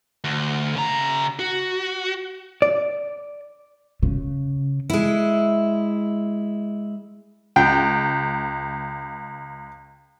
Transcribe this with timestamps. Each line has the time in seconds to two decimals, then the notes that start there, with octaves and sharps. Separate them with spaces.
0.24 D2
0.76 C#3 A#5
1.39 F#4
2.62 D5
4.03 C#3
4.90 G#3 E4
7.56 C#2 G5